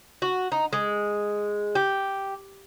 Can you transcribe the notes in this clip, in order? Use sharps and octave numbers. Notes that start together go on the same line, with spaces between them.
F#4
D#4
G#3
G4